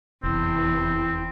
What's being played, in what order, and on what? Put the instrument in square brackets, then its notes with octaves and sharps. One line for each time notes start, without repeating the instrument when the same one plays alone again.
[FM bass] F1 [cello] E2 [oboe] C4 [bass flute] E4